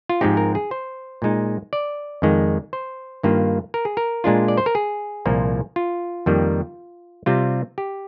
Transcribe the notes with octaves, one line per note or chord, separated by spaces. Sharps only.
F4
G#2 F3 G#3 C4 D#4 G4
A#4
G#4
C5
A#2 G#3 D#4
D5
F2 D#3 G#3
C5
G2 D#3 A#3 F4
A#4
G#4
A#4
A#2 G#3 D4 F4
D5
C5
A#4
G#4
C2 A#2 F3 A#3
F4
F2 D#3 G3 A#3
C3 G3 C4 F4
G4